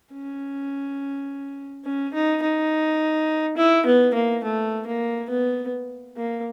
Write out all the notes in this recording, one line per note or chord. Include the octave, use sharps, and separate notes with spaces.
C#4
C#4
D#4
D#4
E4
B3
A#3
A3
A#3
B3
A#3